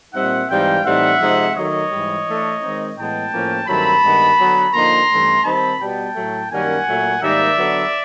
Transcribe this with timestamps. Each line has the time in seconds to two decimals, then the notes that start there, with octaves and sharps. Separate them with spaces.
0.14 A#2 G3 C4 D#4 E5 F#5
0.49 G#2 E3 G3 C4 D#4 F5 G5
0.84 A2 E3 G3 C4 D#4 E5 F#5
1.20 C3 F3 G#3 C4 D#4
1.55 D#3 F#3 A3 C#5 D#5
1.91 G#2 E3 G3
2.26 E3 A3 D4
2.62 D#3 G#3 C4 D#4
2.97 A2 E3 G#3 B3 G5 A5
3.32 A2 F3 A#3 C#4
3.67 G2 D#3 F#3 A3 C4 A5 B5
4.03 G2 D#3 G#3 B3
4.39 D3 F#3 B3
4.73 D3 F3 A#3 D#4 A#5 C6
5.09 G2 E3 A3 C#4
5.44 D#3 G3 C4 D#4 A5 B5
5.80 B2 G3 B3 G5 A5
6.15 A2 F#3 A3
6.50 F#2 D#3 G3 A#3 C#4 F#5 G#5
6.86 A#2 F#3 A3
7.21 G#2 D#3 G3 A#3 D#4 D5 E5
7.57 D3 F#3 B3